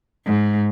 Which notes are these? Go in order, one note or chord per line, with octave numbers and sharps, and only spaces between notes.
G#2